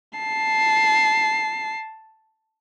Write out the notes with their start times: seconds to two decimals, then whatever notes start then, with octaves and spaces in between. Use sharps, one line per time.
0.19 A5 C7